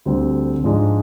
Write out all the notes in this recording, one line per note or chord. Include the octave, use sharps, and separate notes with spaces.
D2 D3 G3 C4
G#2 F3 G#3 D4